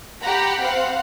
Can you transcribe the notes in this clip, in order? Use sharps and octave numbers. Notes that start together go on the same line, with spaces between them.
G4 F#5 A#5 B5
C4 F5 F#5